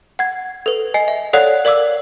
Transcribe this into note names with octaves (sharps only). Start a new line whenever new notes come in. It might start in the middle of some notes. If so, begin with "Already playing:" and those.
F#5 G#6
A4 B4
D#5 G#5 C7
E5
A4 C#5 D5 F5 F#5 F#6
A#4 D5 F5 D6 E6